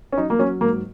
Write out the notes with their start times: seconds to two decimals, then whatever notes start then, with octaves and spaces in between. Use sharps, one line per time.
0.13 C#4
0.18 F#3 D#4
0.30 A#3
0.39 F#3 C#4
0.61 G#2 A#3